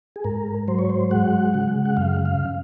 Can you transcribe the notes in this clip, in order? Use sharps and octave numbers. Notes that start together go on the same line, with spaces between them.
G#4
G#2 A#4
F#3 C5
C#5
C5
G#3 F#5
C#3
F#5
F#2 F5
F5